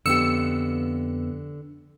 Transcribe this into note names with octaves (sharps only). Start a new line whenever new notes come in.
F2 D3 B3 G4 E6 C#7